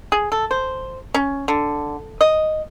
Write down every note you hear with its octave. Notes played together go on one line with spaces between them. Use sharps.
G#4
A4
C5
C#4
D3
D#5